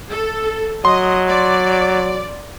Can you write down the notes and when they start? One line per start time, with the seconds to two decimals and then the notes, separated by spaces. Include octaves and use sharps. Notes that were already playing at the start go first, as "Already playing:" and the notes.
0.11 A4
0.85 F#3 D#5 C6
1.27 D5